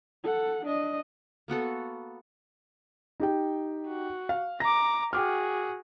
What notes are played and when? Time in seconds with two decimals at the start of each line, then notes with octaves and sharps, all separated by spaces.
0.24 A4 F#5
0.65 D4 D#5
1.48 A#3 B3 F#4 A4
3.20 D#4 G4 G5
3.87 F#4
4.29 F5
4.60 A#5 D6 A#6
5.13 F#4 G#4 G5 D6 F6